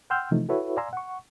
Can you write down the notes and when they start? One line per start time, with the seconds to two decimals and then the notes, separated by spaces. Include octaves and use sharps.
0.10 F#5 G5 C6 E6 F6 G6
0.31 C3 E3 F3 A3 D#4
0.49 E4 F#4 A4 B4 C#5 E5
0.77 D5 F5 G#5 A#5 C6 E6
0.93 F#5 C#6